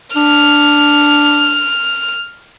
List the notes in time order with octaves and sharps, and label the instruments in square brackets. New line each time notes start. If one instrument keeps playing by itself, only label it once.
[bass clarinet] D4 [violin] F6